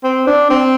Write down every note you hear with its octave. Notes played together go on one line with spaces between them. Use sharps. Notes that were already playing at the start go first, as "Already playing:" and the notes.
C4
D4
C4